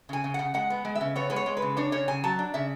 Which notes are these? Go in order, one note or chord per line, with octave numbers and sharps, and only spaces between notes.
C#3 G#5
C#3
C#3 F#5
G#3 F#5
B3
G#3
E5
C#3
B3 C#5
G#3 B4
C#5
G#3
B4
C#3
D4 C#5
C#3 C#5
C#3 G#5
F#3 A5
D4
C#3 E5